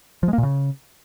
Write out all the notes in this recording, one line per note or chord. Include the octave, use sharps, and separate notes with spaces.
F3
G#3
A#3
A#2
C#3